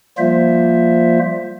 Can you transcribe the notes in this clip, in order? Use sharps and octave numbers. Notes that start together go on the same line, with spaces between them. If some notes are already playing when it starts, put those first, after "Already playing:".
F3 G3 A#3 F4 C5 E5